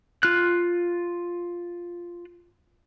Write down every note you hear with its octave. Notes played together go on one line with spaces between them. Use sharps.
F4 F6 F#6